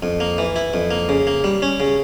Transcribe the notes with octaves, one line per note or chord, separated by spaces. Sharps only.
F2
A#3
E3
E4
F2
A#3
C#3
A#3
G3
C#4
C#3